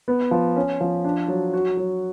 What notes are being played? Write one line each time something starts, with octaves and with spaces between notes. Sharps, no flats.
B3
F3
C#4
F3
D4
F#3
F#4
F#3